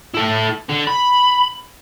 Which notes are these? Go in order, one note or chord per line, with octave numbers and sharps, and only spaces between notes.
E4 A4
D3
B5